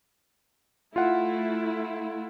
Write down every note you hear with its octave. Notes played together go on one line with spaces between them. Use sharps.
A3 E4 F4 F#5